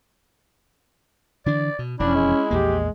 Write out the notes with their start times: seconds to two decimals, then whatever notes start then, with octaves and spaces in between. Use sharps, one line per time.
1.46 D3 E3 D4 D5
1.79 B2
2.00 E1 F2 C#4 D4 E4
2.15 G#3
2.51 A#1 E2 A#3 G4